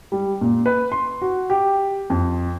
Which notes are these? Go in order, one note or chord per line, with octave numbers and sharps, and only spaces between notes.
G3
A#2
B4
C6
F#4
G4
F2